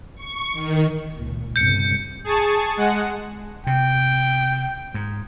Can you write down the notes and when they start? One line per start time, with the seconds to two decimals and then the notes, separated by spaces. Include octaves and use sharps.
0.15 C#6
0.53 D#3
1.16 C#2 A#2
1.56 G1 C#2 C3 G6 C#7
2.24 G#4 A5 C#6
2.77 G#3 F#5
3.67 C3 G5
4.94 G#2